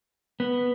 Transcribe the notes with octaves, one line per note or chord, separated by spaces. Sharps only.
B3